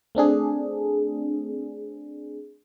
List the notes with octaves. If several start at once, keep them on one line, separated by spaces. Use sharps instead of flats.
A3 C4 D4 G#4